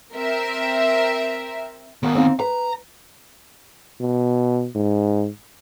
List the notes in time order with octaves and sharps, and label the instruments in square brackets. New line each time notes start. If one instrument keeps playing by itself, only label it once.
[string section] C4 A#4 E5
[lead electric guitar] D#3 B3 [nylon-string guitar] A#3 F5
[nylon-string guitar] C4 D#4 F5
[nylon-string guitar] B4 [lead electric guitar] A#5
[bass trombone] B2
G#2